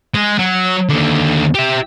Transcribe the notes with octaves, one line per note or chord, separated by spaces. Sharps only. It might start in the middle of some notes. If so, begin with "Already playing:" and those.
G#3
F#3
D#2 D3
G4 E5